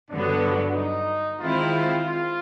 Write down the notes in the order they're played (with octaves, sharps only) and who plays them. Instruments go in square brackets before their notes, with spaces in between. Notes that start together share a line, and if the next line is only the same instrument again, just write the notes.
[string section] G2 D3 F#3 B3 [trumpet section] D4
[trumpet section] D#4
[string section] D#3 G#3 C4 E4 [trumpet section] F4
[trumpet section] F4